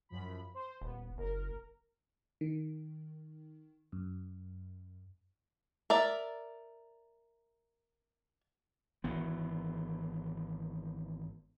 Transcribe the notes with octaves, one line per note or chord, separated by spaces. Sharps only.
F#2 F3 B5
C5
D#1 B3
F#1 A#4
D#3
F#2
A#4 D5 E5
G#1 E3 B3